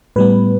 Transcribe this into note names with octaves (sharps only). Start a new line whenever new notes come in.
A2 G3 B3 B4